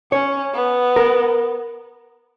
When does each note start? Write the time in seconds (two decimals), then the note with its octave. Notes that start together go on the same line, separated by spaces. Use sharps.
0.12 C#4 C#5
0.54 B3
0.96 A#4